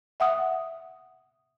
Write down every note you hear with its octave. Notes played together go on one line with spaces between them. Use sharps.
E5 F#5 D#6